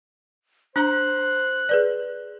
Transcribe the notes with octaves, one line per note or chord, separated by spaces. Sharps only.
D4 C5 A#5 F#6
G#4 B4 D5